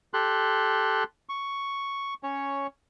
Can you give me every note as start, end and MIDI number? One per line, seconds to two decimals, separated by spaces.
0.14 1.04 67
0.14 1.04 69
0.14 1.04 84
0.14 1.04 90
1.29 2.14 85
2.23 2.67 61
2.23 2.67 73